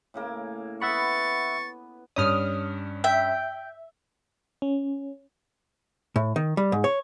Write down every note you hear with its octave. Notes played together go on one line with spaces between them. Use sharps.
A2 C#3 A#3
B3 B4 E5 F#5 B5 C#6 A6
G2 C#4 D#6 F6
E5 G5
C#4
A2
D#3
G3
G#2
C#5